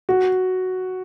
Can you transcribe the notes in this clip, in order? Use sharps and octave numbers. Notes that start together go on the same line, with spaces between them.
F#4